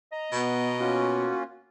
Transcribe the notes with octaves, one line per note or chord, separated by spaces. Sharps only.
D#5 A#5
B2 B3
A#3 C#4 F4 F#4